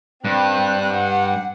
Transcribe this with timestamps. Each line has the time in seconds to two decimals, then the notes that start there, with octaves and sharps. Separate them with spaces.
0.24 G2 C4 F#6
0.93 F#5